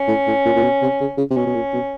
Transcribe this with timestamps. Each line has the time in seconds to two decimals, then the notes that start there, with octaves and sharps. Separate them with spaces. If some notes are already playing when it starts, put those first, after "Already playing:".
Already playing: C#4
0.08 A2
0.27 A2
0.45 A#2
0.56 A#2
0.63 B2
0.82 C3
1.00 C#3
1.18 C#3
1.30 C3
1.36 B2 C#4
1.47 B2
1.55 A#2
1.73 B2